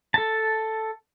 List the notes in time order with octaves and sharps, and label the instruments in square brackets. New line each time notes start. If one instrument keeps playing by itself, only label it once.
[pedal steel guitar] A4 A5